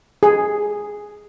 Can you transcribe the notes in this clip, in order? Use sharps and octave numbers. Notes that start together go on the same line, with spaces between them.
G#4